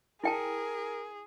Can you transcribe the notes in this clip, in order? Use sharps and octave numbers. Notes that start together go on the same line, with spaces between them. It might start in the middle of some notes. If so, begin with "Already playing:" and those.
E4 G#4 A#4 G5 A5